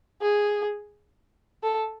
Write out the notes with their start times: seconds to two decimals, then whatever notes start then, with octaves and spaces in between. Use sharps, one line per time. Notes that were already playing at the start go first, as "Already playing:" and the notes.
0.22 G#4
1.63 A4